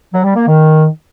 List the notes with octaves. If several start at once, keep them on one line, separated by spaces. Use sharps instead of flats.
F#3
G3
A#3
D#3